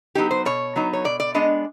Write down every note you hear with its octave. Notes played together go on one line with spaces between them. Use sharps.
F#3 B3 D#4 G4
C5
B2 C#5
F#3 B3 D#4
C#5
B2 D5
D5
G#3 B3 D4 D#5